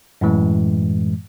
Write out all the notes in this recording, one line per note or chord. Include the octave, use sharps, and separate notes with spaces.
F#2 A2 E3 G#3